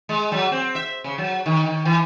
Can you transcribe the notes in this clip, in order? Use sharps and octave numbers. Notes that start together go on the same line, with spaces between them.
G#3
F#3
C4
E5
C#3
F#3
D#3
D#3
E3